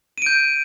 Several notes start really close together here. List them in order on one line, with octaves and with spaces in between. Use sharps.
D#7 D7 G6